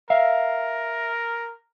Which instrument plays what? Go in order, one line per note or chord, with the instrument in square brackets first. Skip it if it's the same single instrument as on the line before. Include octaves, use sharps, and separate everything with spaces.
[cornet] A#4 [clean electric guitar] E5 F5